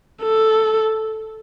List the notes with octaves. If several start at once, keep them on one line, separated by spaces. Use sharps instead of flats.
A4